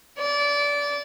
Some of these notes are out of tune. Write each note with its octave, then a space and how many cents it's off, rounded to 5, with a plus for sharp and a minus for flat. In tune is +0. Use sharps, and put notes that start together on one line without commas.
D5 -25